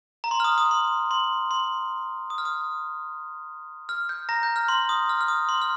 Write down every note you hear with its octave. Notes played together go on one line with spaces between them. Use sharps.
A#5
C6
F6
D#6
D#6
C6
C6
C6
D#6
F6
D#6
F6
G6
A#5 A#6
G6
F6
C6
D#6
F6
F6
D#6
C6
F6